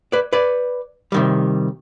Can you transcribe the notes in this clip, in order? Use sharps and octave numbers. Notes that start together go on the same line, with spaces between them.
B4 D5
B4 D5
C3 D#3 G3